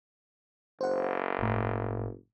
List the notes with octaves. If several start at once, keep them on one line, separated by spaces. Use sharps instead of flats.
F#1 C5 F#5
G1 A2